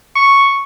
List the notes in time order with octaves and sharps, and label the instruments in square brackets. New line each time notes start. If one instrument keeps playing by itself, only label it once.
[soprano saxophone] C#6